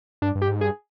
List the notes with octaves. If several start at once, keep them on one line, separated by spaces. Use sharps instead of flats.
G2 D4
G2
G4
G#2
G2 G#4